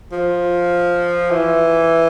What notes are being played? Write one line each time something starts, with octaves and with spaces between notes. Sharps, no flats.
F3
E3